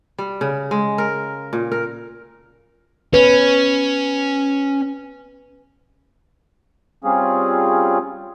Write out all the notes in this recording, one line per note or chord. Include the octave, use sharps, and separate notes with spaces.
G3
C#3
G#3
A#4
A#2
A#4
C#4 B4
G3 C4 C#4 F4 G#4